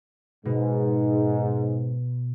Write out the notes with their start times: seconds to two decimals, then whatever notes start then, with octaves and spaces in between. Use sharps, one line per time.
0.45 G#2 B2